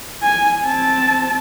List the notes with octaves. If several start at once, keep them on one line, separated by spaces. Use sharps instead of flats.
G#5
C4 A5